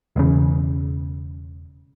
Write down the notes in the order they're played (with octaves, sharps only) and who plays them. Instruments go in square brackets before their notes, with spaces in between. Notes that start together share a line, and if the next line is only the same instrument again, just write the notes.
[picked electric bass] E1 E2 C#3